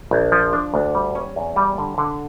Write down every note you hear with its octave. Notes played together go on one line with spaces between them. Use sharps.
A#1
F3
D4
D2
G3
C#4
E2
G3
D3
D3